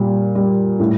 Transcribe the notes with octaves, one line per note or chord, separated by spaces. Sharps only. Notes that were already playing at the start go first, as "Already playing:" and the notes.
Already playing: A#2 G3
G3
A2